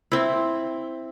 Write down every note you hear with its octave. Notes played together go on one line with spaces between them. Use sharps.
C4 E4